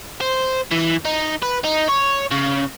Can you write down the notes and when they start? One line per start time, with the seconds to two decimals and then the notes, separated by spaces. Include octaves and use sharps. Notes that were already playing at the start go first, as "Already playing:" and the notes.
0.21 C5
0.71 E3
1.05 D#4
1.43 B4
1.64 D#4
1.89 C#5
2.31 C#3